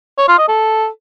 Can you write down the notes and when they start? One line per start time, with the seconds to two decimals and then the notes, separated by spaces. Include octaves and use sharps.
0.18 C#5
0.28 F4
0.38 D#5
0.48 A4